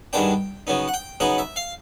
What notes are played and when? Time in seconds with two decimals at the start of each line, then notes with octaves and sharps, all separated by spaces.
0.13 G2 D#3 G#3 B3 D4 G5
0.67 C#3 F#3 B3 D#4
0.88 F#5
0.94 G5
1.20 C#3 F#3 B3 D#4 F#5
1.38 E5
1.56 F5